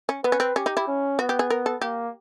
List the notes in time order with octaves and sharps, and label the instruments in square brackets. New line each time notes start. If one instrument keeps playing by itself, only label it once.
[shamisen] C#4
[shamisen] B3 [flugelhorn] B4
[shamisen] C#4
C4
[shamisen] C#4 [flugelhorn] G4
[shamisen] D#4
E4
[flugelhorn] C#4
[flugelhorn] B3 [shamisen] F#4
[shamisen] G4
G#4
A#4
A4
[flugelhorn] A#3 [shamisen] G4